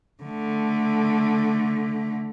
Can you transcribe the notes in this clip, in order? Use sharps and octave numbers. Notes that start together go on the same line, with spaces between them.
D3 A3